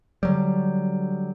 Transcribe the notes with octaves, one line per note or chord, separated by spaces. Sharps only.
D3 F#3 G3